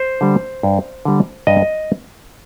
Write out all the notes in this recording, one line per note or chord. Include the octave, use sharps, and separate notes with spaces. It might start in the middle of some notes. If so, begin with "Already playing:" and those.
Already playing: C5
D3 G3
G2
D3 G3
G2 D#5